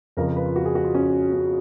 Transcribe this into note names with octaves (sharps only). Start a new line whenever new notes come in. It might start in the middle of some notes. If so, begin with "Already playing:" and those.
F2 C#3 F3 A#4
A#4
B4
F4
F#4
G#4
F#4
F4
C#4
C#4